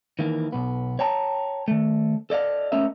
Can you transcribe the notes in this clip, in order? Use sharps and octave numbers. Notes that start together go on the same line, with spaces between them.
D#3 E3 A#3
B1 B3
C#5 G5 A5 A#5
D#3 A3
A4 D5 D#5 F5
A3 A#3 C#4 A#4 D#5 E5